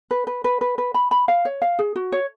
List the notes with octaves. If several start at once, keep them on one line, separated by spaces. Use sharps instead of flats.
B4
B4
B4
B4
B4
B5
B5
F5
C#5
F5
G#4
F#4
C#5